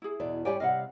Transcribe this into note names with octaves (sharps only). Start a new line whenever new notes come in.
E4 G#4
E2 B2 D5
G3 G4 C#5 D5 G5 G#5
C3 G3 D#5 F5 F#5